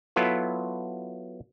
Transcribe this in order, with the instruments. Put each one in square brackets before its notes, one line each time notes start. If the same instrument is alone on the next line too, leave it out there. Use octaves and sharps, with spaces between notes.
[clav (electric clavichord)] F#3 B3 E4 F4 A4